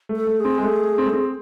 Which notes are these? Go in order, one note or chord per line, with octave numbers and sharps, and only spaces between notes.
A3
A4
A3
G#4
C4
G#3
A3
C4
A3
C4